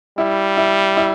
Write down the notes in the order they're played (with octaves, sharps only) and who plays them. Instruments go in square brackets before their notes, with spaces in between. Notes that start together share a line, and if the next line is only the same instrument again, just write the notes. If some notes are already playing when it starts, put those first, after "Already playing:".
[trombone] G3 [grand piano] E4
[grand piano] E4
E4